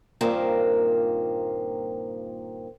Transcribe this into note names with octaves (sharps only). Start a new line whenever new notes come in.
G2 A#2 D#3 F3 A#3 C4